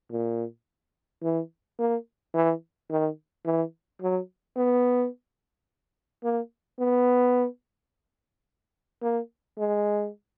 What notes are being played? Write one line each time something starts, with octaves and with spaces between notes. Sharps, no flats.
A#2
E3
A#3
E3
D#3
E3
F#3
B3
A#3
B3
A#3
G#3